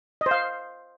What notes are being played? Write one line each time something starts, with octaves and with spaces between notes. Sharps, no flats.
D#5
C5
F5